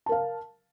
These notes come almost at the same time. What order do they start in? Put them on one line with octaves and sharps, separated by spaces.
A5 A#4 F5